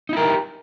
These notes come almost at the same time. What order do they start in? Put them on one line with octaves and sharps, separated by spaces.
D#4 E4 A#4 F#4 G4